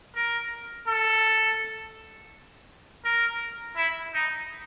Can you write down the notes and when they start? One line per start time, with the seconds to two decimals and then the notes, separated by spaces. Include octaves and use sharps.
0.15 A#4
0.88 A4
3.04 A#4
3.76 E4
4.14 D#4